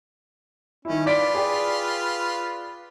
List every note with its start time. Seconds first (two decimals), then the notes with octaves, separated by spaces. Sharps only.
0.85 D#3 C#4 E4
1.06 F4 B4 D5 B6 D7
1.34 G#4 D5 G5